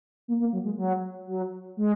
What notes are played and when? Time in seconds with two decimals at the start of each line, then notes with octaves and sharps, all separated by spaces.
0.28 A#3
0.40 A#3
0.53 F#3
0.65 G#3
0.78 F#3
1.27 F#3
1.77 G#3